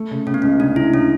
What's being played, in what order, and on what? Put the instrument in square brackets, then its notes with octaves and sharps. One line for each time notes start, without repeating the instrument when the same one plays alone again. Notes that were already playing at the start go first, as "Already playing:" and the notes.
Already playing: [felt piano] A3
C#3
[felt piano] C#3 [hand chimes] C#4
[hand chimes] B3
[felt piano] C#2 [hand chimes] C#4
[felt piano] C#3 [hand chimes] D4
[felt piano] C#2 [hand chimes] E4
[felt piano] C#3 [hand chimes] C#4